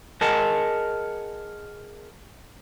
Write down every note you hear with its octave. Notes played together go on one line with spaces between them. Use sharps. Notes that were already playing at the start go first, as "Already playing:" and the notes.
G#4 A#4 D#5 F#5 G#5 A5